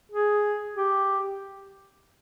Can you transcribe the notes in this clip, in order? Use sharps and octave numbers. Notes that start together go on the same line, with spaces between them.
G#4
G4